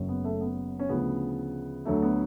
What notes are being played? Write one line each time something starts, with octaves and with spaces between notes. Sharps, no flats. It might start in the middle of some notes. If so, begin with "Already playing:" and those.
Already playing: F#1 F#2 C#3 F#3
B3
A3
B3
C#4
D2 C#3 F3 B3
D2 D3 F#3 A3
B3